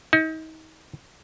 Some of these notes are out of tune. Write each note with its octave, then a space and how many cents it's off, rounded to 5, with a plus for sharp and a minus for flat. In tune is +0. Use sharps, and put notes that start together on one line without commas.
D#4 +35